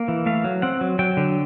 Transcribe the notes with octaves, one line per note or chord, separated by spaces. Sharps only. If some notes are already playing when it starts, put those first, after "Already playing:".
Already playing: A#3
E3
A3 F5
F#3
C4 F#5
F#3
F#3 G5
D3